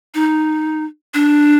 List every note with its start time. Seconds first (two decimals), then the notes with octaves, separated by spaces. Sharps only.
0.15 D#4
1.14 D4